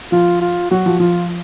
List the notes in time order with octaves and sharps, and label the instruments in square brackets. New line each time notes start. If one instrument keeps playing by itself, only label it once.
[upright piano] F3 [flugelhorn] F4
[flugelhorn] F4
[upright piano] F#3 [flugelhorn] F#4
[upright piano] F3
[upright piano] F3 [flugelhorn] F4